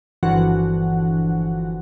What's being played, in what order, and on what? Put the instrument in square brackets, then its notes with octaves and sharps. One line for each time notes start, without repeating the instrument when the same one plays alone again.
[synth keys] G1 D3 E3 F3 F#4 F#5